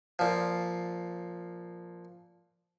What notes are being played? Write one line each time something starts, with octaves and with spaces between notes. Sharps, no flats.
A#2 F3